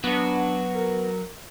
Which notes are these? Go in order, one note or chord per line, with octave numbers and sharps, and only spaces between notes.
F#3 B3 D4 F#4
A#4